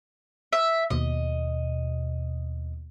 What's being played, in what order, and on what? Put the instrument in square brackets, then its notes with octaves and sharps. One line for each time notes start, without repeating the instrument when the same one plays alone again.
[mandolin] E5
[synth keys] D#2 B2 [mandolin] D#5